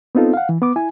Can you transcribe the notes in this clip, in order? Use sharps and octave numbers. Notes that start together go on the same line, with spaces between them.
B3 C4 D#4 F4 A4
F5 F#5
E3
B3 D6
E4 G#5